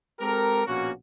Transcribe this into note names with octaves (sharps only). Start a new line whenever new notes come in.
G#3 C4 G4 A4 A#4
A#1 B2 A#3 C#4 F#4